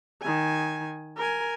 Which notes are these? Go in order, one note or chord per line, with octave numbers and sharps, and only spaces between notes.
D#3 G#5
A#4 G#5